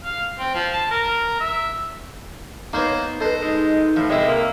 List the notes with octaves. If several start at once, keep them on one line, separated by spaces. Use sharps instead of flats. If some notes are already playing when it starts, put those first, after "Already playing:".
F5
C4
F3
A5
A#4
E5
A#3 B3 D#4 C5 C#5
A4 B4 C5 D#5
G#3 D#4
A2 F3
C2 G#3 E4
A#3